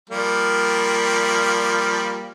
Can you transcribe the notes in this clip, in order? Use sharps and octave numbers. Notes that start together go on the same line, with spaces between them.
F3 G3 A#3